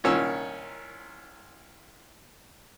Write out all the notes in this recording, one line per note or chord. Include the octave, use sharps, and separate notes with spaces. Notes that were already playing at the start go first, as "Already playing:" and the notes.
C2 A#2 D#3 C#4 E6